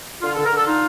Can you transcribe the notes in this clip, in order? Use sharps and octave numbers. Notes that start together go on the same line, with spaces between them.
D3 F4
A4
D3
A#4
D3 A4
D#4 F4